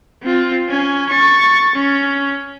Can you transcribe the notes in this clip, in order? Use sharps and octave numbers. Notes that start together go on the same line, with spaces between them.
C4 F4
C#4 G#5
C#6 A6
C#4